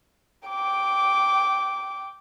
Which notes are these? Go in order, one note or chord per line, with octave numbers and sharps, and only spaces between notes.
G5 D6